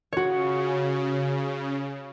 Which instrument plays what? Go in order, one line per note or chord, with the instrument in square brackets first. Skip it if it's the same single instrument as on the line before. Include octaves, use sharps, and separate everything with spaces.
[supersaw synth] C#3 [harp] F#4 C#5